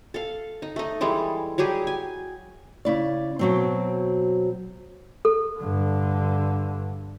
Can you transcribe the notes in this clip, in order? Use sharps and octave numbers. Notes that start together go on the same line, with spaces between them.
A4 F5
D#4
A3 D#4
E3 G3 G#3 A4
F#3 G3 G4 G#4
G#5
C#3 E4 D5
B2 F#3 C4
A4
G2 D3